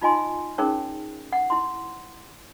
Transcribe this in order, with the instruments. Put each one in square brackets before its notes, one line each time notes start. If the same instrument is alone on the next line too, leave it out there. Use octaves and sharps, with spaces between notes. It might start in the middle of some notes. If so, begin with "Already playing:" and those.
[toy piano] D#4 F4 D#5 G#5 C6
C#4 D#4 G#4 A#4 C#5
F#5
E4 C6